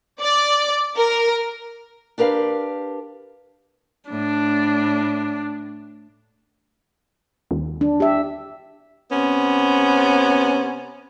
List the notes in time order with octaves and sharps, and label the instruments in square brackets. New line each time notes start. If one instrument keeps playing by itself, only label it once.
[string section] D5
A#4
[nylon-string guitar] D4 G4 A#4 B4 F5
[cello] A2 [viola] D4
[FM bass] D#2
[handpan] D4
G4 E5
[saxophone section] C3 B3 C#4